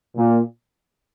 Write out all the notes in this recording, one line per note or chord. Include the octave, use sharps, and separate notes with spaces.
A#2